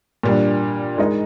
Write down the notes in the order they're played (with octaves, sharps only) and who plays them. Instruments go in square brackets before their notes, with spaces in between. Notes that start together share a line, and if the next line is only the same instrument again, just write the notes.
[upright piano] A#2 G3 D4
G#3 D#4 A#4 D#5